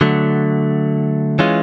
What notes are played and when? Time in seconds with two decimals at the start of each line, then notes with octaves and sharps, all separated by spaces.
0.01 D3 F#3 A3
1.39 E3 G#3 C#4 F4